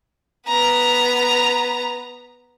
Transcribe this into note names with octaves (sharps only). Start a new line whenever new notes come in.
B3 A#5